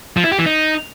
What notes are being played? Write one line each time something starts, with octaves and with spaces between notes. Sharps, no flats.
F3
E4
G4
E3
D#4